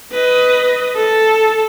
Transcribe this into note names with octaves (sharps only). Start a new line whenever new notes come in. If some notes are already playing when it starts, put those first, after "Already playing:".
B4 D#5
A4